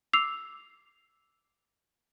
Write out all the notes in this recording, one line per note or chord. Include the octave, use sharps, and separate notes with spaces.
D6 E6 C7 F7